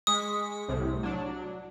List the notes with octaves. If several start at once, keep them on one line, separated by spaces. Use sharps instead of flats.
G#3 C#6 D#6 B6
C2 A2 C3
F#3 D4